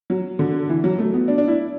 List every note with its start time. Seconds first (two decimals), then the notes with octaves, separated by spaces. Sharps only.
0.10 F#3
0.39 D3
0.69 E3
0.84 F#3
0.99 A3
1.14 B3
1.28 D4
1.38 D4
1.48 E4